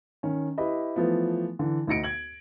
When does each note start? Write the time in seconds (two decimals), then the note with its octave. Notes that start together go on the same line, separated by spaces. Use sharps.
0.23 D#3 C#4
0.58 E4 G4 B4 D#5 B5
0.96 E3 F3 A3 B3
1.59 D3 E3
1.87 D2 D#4 A#6 C#7 D7
2.04 G#6 F#7